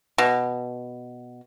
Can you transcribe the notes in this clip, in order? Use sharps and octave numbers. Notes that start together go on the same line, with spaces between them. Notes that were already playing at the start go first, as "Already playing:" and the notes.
B2